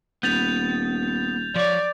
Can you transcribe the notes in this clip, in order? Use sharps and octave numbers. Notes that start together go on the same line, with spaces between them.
D#1 B3 G6 A6 F7
F3 C#5 D5